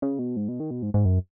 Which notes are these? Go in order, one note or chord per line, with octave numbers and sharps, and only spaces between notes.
C#3
B2
G#2
B2
D#3
B2
G#2
G#2
F#2